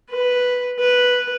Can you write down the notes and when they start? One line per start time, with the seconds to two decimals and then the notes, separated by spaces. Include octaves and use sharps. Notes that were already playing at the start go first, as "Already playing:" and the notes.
0.11 B4
0.80 B4